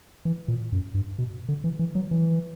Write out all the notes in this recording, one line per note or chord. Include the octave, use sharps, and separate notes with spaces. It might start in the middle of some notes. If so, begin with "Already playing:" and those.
E3
A#2
F#2
G2
B2
D3
E3
E3
F#3
E3